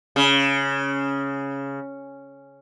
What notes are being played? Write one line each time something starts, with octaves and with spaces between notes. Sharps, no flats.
C#3